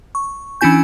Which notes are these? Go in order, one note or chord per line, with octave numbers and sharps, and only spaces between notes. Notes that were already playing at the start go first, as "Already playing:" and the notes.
C#6
E3 C#4 D4 E4 G#5 G6